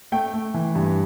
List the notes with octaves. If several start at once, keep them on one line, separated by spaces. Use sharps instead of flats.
A3 G5
A3
E3
G2